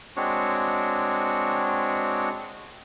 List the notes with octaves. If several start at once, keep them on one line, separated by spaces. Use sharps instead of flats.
G#3 C4 D4 F#4 C#5